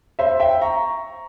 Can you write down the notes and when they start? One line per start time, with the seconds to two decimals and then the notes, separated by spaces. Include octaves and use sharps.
0.19 C5 E5
0.40 E5 G5
0.62 A#5 C#6